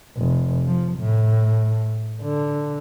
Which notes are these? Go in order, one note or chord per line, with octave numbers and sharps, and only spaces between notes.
F1
F3
A2
D3